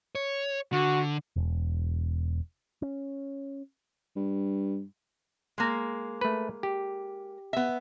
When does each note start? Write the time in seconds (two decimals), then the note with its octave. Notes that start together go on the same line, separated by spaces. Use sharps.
0.15 C#5
0.72 D3 F#4
1.36 E1
2.82 C#4
4.16 G2
5.58 G#3 A#3
6.21 A3 B4
6.63 G4
7.53 B3 E5